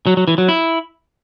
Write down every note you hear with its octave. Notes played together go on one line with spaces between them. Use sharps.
F#3
F#3
E3
F#3
E4